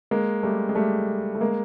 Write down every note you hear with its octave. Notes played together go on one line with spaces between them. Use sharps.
G#3 A#3
G3 A3
G#3
G3 A3
A3
G#3 A#3